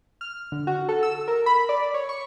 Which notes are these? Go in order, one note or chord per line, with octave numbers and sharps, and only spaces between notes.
F6
D3
F#4
A4
E6
A#4
B5
D5
C#5
C#6